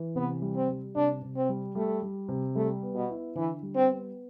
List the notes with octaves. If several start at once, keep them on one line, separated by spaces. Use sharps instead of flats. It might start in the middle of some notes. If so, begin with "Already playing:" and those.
Already playing: E3
C3 B3
G3
C4
G3
C3 D4
C3
C4
G3
G3 A3
G3
C3
G3 A3
B3
B2
E4
D3 E3
G3
C4
B3